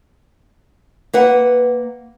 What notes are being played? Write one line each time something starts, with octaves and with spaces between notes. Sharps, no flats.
A#3 B4 F#5